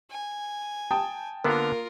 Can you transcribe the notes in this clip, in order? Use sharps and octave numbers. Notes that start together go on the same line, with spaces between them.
G#5
G5 A5 D#6
D3 A#3 B3 D4 F4 A#4